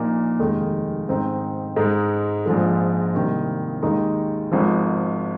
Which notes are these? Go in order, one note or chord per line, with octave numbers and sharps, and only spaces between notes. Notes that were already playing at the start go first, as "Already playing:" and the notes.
Already playing: A#1 A#2 A#3 D#4
F1 D#2 D#3 G#3 D#4
G#2 D#3 C4 D#4
G#2 G#3 D#4
A#1 G#2 F3 G#3
C2 C3 D#3 A#3
D#2 D#3 G#3 D#4
G#1 G#2 F3